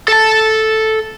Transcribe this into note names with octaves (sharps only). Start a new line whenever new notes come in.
A4 A5